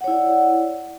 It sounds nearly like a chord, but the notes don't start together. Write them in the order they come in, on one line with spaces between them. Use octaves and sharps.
F#5 C#5 E4 D5